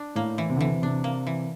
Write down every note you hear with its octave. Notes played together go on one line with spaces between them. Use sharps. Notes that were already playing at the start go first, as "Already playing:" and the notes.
Already playing: D4
A2 A#3
E3
C3
D3
C3 E3
C3 D4
A#3
E3